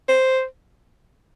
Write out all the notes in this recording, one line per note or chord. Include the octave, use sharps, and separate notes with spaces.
C5